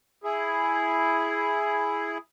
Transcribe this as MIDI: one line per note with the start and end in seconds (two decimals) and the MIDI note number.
0.24 2.18 64
0.24 2.18 68